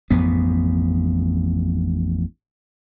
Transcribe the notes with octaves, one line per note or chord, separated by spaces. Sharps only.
A1 F2 G#2 B3